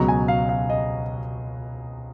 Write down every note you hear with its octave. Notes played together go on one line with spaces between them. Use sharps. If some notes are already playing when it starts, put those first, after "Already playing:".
Already playing: C#2 B2 F#3 A#5
G#5
F5
F5
D#5